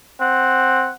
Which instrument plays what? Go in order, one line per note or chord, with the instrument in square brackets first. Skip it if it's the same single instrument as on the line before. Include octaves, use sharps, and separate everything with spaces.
[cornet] C4 [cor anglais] F#5